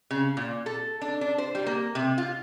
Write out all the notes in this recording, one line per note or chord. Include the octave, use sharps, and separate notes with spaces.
C#3
A#2
A4
D4
D4
C5
G3
A#3
C3
F4